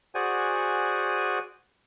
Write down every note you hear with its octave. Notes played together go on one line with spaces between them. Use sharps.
F#4 G#4 C5 D5 F#5 G#5